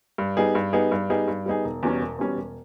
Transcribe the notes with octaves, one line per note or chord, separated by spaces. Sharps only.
G2
G3 B3 D#4 G#4
G2
G3 B3 D#4 G#4
G2
G3 B3 D#4 G#4
G2
G3 B3 D#4 G#4
E1
E2 B2 G3 C#4
E1
E2 B2 G3 C#4
E1